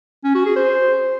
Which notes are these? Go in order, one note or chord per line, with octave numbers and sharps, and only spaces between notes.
C#4
F#4
G#4
C5